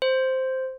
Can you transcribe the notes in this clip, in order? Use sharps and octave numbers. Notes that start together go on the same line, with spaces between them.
C5